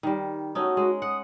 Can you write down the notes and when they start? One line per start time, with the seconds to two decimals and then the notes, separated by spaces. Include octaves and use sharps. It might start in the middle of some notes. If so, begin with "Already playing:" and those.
0.03 D#3 G3
0.55 A3 C#4 D#4 F#4
0.77 G#3
1.02 F#5 D#6